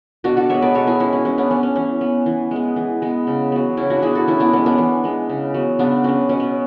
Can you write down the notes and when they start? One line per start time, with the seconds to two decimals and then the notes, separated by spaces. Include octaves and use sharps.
0.24 B2 D4 F#4
0.37 F#4 A4
0.50 G#3 B3 C#5 E5
0.62 B4 D5
0.75 B2 A4 C#5
0.87 E4 G#4
1.00 G#3 B3 C#4 E4
1.13 C#4
1.25 E3 C#4
1.38 B3 D4
1.51 B3 C#4
1.63 C#4
1.76 E3 C#4
2.01 B3
2.26 E3
2.51 G#3 B3
2.76 E3
3.02 G#3 B3
3.27 C#3
3.52 F#3 B3
3.77 C#3 C#4 E4
3.90 D4 F#4
4.02 F#3 B3 E4 G#4
4.15 F#4 A4
4.28 E3 C#4 E4
4.40 B3 D4
4.53 G#3 B3 C#4
4.66 B3 D4
4.78 E3
5.04 G#3 B3
5.29 C#3
5.54 F#3 B3
5.79 C#3 B3 D4
6.04 F#3 B3 C#4
6.29 B2 C#4
6.40 B3